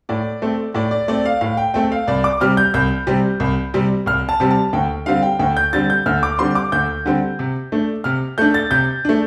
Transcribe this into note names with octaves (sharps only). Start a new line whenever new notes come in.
A2 D5
A3 C4
A2 D5
D5
A3 C4 D5
F5
A2 F5
G5
A3 C4 G5
F5
C2 D5
D6
C3 G3 C4 F6
G6
C2 G6
C3 G3 C4
C2
C3 G3 C4
C2 F6
A5
C3 G3 C4
A5
D2 G5
D3 G3 C4 F5
G5
D2 G5
G6
D3 G3 C4 A6
G6
D2 F6
D6
D3 G3 C4 C6
D6
D2 G6
D3 G3 C4
C3
A3 D4
C3 F6
A3 D4 G6
A6
C3 G6
A3 D4